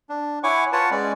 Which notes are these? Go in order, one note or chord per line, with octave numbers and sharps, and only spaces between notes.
D4
E4 C#5 F#5 G#5 C#6 D6
F4 B4 C#5 F#5 A5
G#3 C#4 D5